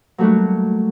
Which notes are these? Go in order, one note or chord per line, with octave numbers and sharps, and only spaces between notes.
F#3 G3 A3 A#3 D4 F#4